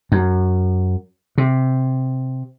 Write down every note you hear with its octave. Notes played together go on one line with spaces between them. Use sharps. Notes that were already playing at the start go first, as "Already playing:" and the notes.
F#2
C3